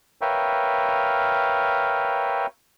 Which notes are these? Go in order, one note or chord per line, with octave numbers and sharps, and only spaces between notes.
A#4 B4 C#5 E5 F5 G5